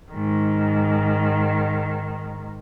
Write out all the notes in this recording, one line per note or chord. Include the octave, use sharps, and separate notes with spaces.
G#2 D#3